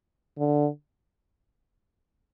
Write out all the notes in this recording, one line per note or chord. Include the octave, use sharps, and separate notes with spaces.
D3